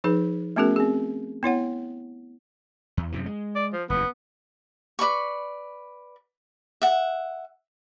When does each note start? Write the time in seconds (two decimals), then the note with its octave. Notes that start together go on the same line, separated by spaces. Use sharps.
0.04 F3 D#4 G#4 B4
0.56 A3 B3 C#4 F#4 G#4 A#4
0.76 C4 G#4
1.43 B3 E4 C#5 F#5
2.97 E2
3.12 F#2 C3 E3
3.26 G#3
3.56 D5
3.73 F3
3.90 F#1 E2 B3
4.99 B4 D5 B5 C#6
6.82 E5 F#5